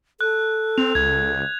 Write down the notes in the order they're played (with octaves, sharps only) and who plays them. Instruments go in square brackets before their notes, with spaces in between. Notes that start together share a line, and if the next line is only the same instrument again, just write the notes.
[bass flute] A4 [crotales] F#6
[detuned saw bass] C4 [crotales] F7
[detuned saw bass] C#2 [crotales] G#6